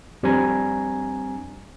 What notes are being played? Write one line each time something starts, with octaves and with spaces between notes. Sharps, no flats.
F2 G3 C4 D4 G#5 A#5